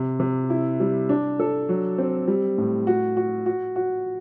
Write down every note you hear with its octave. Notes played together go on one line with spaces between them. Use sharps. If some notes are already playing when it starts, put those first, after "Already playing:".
Already playing: C3
C3
E4
G3
D4
A4
F#3
C4
G3
A2
F#4
F#4
F#4
F#4